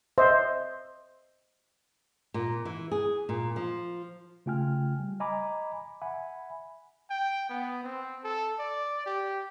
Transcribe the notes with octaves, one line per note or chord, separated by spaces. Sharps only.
C5 D#5 E5
A#2
E3
G#4
A#2
F3
C#3 A3 F4 G5 G#5 F6
G3
D#5 G#5 A#5 B5 D6
E5 F#5 G#5 B5
G5
B3
C4
A4
D5
G4